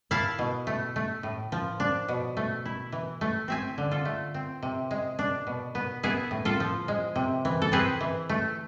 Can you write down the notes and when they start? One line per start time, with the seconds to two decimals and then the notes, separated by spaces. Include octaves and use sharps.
0.11 E4 F5 A5
0.39 B2
0.67 A3
0.96 A3
1.23 A2
1.52 F3
1.80 D4
2.08 B2
2.37 A3
2.65 E4
2.92 E3
3.21 A3
3.48 C4 E5 G#5
3.78 D3
3.91 F4 A4
4.05 A3
4.34 C4
4.63 C3
4.91 G#3
5.19 D4
5.47 B2
5.75 B3
6.03 B3 E4 G#4
6.31 A2
6.45 F4 A4
6.60 F3
6.88 G#3
7.16 C3
7.45 E3
7.62 A4
7.72 C4 G#4 B4
8.01 E3
8.29 A3